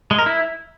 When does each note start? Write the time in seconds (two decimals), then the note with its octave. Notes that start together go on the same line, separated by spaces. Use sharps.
0.11 G#3
0.19 A#4
0.26 E4